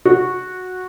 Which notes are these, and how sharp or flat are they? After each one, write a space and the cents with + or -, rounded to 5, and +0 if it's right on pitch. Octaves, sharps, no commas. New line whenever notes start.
F#4 -10